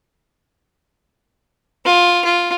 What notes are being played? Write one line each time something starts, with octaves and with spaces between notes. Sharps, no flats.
F4
F4